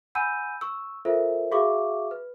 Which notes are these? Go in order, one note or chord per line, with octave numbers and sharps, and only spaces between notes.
F#5 G#5 B5 E6 G6 D#7
C#6 E6
F4 A4 A#4 C5 E5
F#4 G#4 E5 F5 C#6 D6
B4